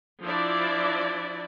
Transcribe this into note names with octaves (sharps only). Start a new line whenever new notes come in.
F3 D4 E4 D5